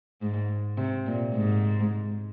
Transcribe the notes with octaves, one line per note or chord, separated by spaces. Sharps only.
G#2
C3
A#2
G#2